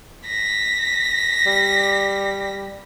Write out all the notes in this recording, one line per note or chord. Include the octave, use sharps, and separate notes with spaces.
A#6 B6
G3